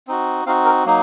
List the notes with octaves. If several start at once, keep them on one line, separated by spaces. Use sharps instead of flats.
C4 D#4 F#4
C4 D#4 F#4 F5
A#4
F#3 A#3 D#4